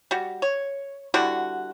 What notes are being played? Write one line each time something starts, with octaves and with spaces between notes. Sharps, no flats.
G3 F#4
C#5
D3 G3 E4 F#4